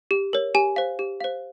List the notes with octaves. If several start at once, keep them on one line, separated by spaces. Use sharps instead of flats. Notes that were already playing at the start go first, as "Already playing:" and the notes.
G4
A#4 C#5
G4 G#5
C5 F5
G4
C5 F5